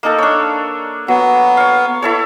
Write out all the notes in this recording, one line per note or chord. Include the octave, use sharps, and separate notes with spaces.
A#3 D#4 A4
D4 C#5
F#3 B3
C#5 F5
E4 A4 C#5